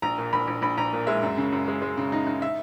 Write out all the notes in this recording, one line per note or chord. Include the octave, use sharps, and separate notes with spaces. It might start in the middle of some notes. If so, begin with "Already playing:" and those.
A#1 A#5
A#2
A#1 B5
A#1
A#1 B5
A#1 A#5
A#2
G#3 E5
F#2
C#3
F#2
G#3
G#3
C#3
D#4
D#4
E5